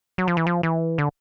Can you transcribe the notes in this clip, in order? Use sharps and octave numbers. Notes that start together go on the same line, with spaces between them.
F#3
F3
E3
F3
E3
D3